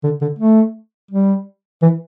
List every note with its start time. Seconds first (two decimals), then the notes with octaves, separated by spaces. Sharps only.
0.03 D3
0.21 D3
0.39 A3
1.11 G3
1.82 E3